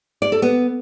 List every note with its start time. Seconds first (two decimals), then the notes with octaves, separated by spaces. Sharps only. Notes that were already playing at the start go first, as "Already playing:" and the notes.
0.22 D5
0.32 A4
0.42 B3